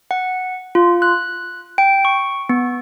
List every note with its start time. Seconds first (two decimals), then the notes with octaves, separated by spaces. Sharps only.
0.11 F#5
0.75 F4
1.02 F#6
1.78 G5
2.05 C#6
2.49 B3